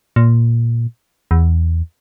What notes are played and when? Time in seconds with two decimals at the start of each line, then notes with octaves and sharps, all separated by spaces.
0.16 A#2
1.31 E2